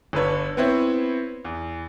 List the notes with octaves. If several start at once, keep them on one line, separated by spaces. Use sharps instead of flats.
G1 D3 B4 C#5
B3 C4 E4 C#5
E2